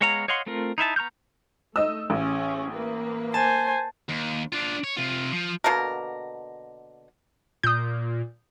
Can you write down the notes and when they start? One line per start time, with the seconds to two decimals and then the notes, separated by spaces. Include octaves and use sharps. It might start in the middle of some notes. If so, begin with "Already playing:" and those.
0.01 G#3 B3 C#5 F5 A#5
0.28 C#5 D#5 F5 F#5 C6
0.46 A3 C4 F4 A#4
0.78 D#4 E4 E5 A5
0.96 B3 A#5 C#6 F6 G6
1.76 A3 D#4 D#5 E6
2.10 A1 C#4 G#4
2.71 A#3 B4
3.34 C5 G#5 A5
4.09 D#2
4.53 D4 F4
4.84 C#5
4.97 C3 F4
5.32 F3
5.64 B2 D3 A#3 A#4
7.63 A#2 D#6 G6